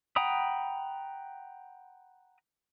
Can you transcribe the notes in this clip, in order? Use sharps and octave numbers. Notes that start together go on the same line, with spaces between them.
F#5 G5 A#5 B5 D#6